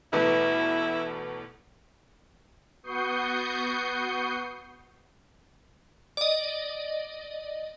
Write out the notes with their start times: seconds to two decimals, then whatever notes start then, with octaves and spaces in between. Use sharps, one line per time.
0.13 E2 B2 A3 E4 B4
2.83 B3 F#4 C#6 D#6 G6 C7
6.17 D5 D#5